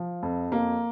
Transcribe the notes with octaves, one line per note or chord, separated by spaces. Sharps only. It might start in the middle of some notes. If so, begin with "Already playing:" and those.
Already playing: F3
F2
A#3